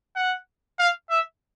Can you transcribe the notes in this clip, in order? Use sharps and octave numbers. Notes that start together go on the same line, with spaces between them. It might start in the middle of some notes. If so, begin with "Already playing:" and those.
F#5
F5
E5